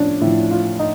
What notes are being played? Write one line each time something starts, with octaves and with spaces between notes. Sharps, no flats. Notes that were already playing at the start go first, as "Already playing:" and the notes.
Already playing: A2 F3 C#4 D4
A2 F3 E4
F4
D#4